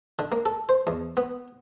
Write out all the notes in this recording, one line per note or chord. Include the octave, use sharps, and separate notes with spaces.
D3
A#3
A4
C5
E2
B3